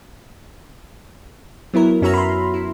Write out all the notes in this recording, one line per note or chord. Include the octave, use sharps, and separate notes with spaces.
F#3 B3 E4 A#4
F#2 C#4 F#4 E5 A#5 F6
B5 C6
E4